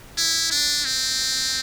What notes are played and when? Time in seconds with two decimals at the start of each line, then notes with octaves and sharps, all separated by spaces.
0.17 E4
0.51 D4
0.85 C4